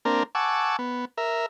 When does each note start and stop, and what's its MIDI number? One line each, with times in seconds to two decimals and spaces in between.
0.05 0.23 58
0.05 0.23 60
0.05 0.23 62
0.05 0.23 70
0.35 0.76 78
0.35 0.76 80
0.35 0.76 81
0.35 0.76 85
0.35 0.76 86
0.35 0.76 88
0.79 1.05 59
1.18 1.46 70
1.18 1.46 76